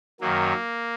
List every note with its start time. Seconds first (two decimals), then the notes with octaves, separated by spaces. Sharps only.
0.20 F#2 D#3 F#3 A#3